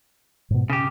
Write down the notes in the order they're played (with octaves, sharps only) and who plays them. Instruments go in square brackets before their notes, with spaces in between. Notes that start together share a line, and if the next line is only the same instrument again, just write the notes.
[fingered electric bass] G#2 B2
[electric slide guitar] C#3 G4 [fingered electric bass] C#4